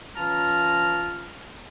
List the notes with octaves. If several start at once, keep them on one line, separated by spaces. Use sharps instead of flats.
E3 C#4 F4 A5 A#5 F6